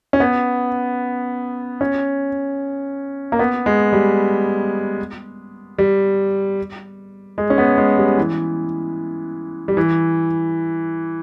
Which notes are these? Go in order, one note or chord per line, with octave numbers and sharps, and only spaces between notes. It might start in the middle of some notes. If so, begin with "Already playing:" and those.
C#4
B3
C#4
A#3
B3
G#3
G3
G3
G#3
C#4
B3
G#3
G3
E3
G3
E3